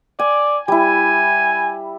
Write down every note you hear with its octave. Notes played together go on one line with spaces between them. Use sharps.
D5 G#5
G3 E4 G#5